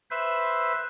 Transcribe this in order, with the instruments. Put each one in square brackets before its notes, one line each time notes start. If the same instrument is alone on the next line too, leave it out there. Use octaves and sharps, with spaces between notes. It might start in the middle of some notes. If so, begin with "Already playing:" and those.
[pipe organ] B4 C5 E5